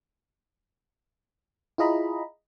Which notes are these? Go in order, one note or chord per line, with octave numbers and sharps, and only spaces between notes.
E4 F4 G#4 D#5 A#5 B5